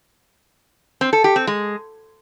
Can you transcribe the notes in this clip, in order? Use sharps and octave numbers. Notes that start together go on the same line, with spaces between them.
C4
A4
G4
C4
G#3